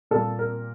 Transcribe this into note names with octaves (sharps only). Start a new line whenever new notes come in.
A#2 G3 A#3 A4
A#4